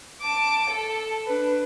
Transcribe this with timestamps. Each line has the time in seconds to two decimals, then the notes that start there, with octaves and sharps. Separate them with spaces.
0.22 A5 D6
0.70 A4
1.26 D4 B4